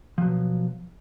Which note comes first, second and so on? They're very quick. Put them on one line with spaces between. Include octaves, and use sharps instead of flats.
F3 F#3 B2